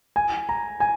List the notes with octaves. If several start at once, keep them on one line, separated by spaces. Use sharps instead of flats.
G#5
A#5
G#5